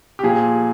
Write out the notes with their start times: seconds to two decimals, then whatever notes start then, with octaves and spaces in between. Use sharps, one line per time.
0.19 G4
0.23 A#2 F3 G#4